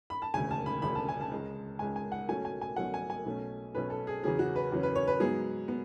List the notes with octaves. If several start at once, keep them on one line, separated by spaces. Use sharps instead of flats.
B5
A5
E1 D2 C#3 G#5
A5
B5
E1 D2 C#3 B5
A5
G#5
A5
C#2 C#3 G#3
C#2 C#3 G#3 G#5
G#5
F#5
B1 B2 F#3 A3 C#4 G#5
G#5
G#5
B1 B2 F#3 A3 C#4 F#5
G#5
G#5
B1 B2 A3 C#4
B1 B2 A3 C#4 B4
A4
G#4
E2 C#3 F#3 C#4 G#4
F#4
B4
E2 C#3 F#3 C#4
B4
C#5
B4
G#2 F#3 B3 G#4
B3